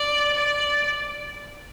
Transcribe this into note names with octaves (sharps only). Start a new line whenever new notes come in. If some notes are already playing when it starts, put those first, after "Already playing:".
Already playing: D5
D5